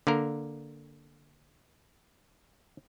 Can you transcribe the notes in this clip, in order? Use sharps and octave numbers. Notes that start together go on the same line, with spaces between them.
D3 A#3 A#4